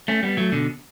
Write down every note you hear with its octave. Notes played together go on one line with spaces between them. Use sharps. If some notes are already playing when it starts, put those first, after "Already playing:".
A3 C#4
G3 B3
F#3 A3
B2 D3